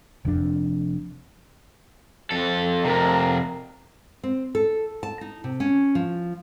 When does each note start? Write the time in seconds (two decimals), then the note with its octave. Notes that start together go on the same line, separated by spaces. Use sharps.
0.25 F1 F2 D4
2.31 F2 A4
2.85 F2 C3 A#4
4.23 C4
4.55 A4
5.03 A5
5.21 D#4
5.44 C3
5.60 C#4
5.95 F3